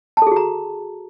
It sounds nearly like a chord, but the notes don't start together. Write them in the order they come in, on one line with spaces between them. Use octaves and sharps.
A5 A4 G#4 F#4 A#5